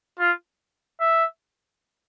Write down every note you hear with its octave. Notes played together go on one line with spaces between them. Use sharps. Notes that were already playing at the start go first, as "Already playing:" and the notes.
F4
E5